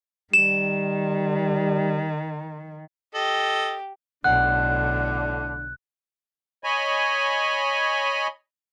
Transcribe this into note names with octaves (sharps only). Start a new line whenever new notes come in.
D#3 G3 E7
G4 A4 D#5
B1 A2 D3 D4 F#5 F#6
C#5 D#5 G#5 B5